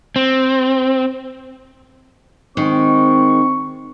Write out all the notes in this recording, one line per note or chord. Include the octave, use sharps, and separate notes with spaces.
C4
D#3 G#3 C4 C#6